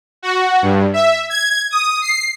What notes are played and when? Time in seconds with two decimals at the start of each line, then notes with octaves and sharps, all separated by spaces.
0.23 F#4
0.62 G2
0.93 E5
1.30 G#6
1.71 D#6
2.02 C7